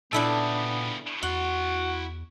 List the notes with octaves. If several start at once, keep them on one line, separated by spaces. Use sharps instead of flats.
A#2 C#3 G3 B3 D4 E4 A4
E2 E4 F#4 F#5 C6